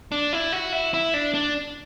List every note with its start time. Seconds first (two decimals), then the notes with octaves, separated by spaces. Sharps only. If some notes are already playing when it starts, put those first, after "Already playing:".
0.12 D4
0.33 E4
0.52 F#4
0.73 E4
0.94 E4
1.14 D4
1.34 D4